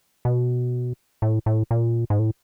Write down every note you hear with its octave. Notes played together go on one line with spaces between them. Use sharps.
B2
A2
A2
A#2
G#2
A2